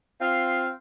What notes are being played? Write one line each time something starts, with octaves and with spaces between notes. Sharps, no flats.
C4 F4 F5